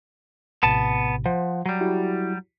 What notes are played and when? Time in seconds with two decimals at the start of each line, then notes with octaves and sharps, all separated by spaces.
0.63 A#1 A2 C3 B3 A5
1.26 F3 C5 F#5
1.66 F#3 G3
1.81 E4 F#4 G4